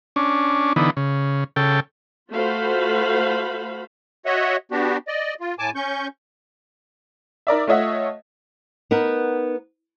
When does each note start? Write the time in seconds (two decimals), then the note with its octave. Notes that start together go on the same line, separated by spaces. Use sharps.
0.16 C#4 D4
0.76 D3 E3 B3 D#4
0.97 C#3
1.56 C#3 A4 G5
2.30 A3 F4 F#4 C5 F5 B5
4.26 F#4 C#5 D#5 E5 F#5
4.72 B3 D4 F#4 G4
5.08 D5 D#5
5.40 F4
5.59 A2 G#5 A5 D6
5.75 C#4 C#6 G6
7.47 D#4 A#4 D5 E5
7.67 A3 F4 C#5 D#5 E5 F#5
8.91 B3 D#4 A#4 B4